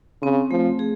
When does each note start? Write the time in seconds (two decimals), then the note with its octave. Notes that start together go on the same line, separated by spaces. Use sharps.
0.22 C#3 C4
0.51 F3 A3
0.79 G#4